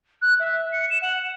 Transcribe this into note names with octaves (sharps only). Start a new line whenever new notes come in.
F#6
E5
C#7
E7
F#5